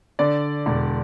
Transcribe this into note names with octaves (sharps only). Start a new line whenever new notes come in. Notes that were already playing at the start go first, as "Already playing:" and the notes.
D3 D5
E1